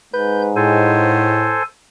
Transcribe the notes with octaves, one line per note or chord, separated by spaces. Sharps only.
G#2 B4 G6
A2 G#3 A4 C5 G#5